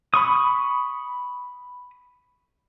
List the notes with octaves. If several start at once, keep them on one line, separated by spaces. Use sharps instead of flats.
B5 C#6 D#6